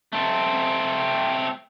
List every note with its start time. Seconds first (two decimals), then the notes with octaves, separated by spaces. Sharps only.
0.13 A3 C4